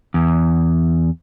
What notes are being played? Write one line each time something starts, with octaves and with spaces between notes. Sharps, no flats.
E2